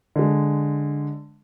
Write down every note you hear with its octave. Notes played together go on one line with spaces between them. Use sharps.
D3 G#3